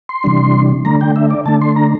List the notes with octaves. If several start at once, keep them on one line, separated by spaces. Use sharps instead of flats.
C6
C3 E3 G3 D4
D3 A3 D4 A#5
G5
E5
D5
D3 A3 D4 A5
C6
A#5